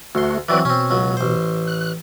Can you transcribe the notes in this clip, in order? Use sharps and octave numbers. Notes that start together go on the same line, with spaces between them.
D2 A3 F#4 C6
E3 F#3 C4 B4 D5
B2 C4 C#4
C#2 F#3
A1 C5
F#6